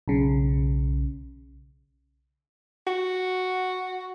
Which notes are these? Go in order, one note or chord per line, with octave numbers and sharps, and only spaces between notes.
B1 C#3
F#4